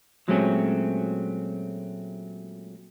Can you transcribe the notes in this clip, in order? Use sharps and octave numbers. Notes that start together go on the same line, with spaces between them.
A#2 F#3 G#3 A3 C4 C#4